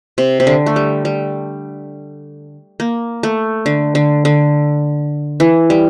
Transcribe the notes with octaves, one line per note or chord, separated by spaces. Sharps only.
C3
C3
D3
A3
G3
G3
A#3
A3
D3
D3
D3
E3
G3